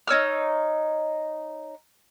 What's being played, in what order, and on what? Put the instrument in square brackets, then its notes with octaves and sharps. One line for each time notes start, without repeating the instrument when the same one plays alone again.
[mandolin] D#4 C#5 E6 F6